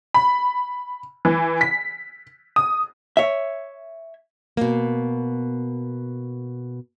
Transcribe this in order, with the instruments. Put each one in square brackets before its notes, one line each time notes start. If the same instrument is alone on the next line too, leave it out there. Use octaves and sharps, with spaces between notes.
[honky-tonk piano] B5
E3
B6
D#6
[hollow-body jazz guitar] C#5 E5
[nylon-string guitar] B2 A#3